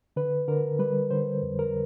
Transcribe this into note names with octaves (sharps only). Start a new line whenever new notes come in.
D3 B4
D3 A#4
G3 B4
D3 C5
F2
A#4